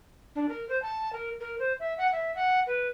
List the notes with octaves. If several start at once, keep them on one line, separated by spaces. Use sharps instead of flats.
D4
A#4
C5
A5
A#4
A#4
C5
E5
F#5
E5
F#5
B4